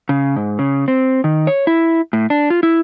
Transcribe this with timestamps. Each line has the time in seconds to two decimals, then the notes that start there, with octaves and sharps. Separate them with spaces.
0.09 C#3
0.36 G#2
0.59 C#3
0.88 C4
1.24 D#3
1.47 C#5
1.67 E4
2.13 A2
2.30 D4
2.50 F4
2.63 E4